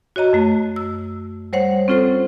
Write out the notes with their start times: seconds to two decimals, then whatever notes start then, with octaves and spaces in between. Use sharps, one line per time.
0.16 F#4 C#5 D#5 A#5
0.33 F#2 A3
0.76 E6
1.53 G3 C5 C#5 F#5
1.88 C4 C#4 F4 A4 C5